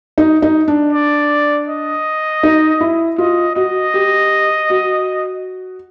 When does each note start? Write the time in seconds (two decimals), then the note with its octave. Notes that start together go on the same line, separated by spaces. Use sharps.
0.18 D#4
0.42 D#4
0.68 D4
0.93 D5
1.68 D#5
2.43 D#4
2.81 E4
3.18 F4 D#5
3.56 F#4 D#5
3.94 G4
4.70 F#4